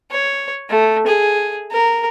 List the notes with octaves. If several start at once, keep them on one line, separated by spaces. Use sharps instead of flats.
C#5
A3
G#4
A#4